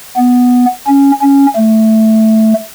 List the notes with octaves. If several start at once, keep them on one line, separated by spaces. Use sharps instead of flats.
B3
C#4
C#4
A3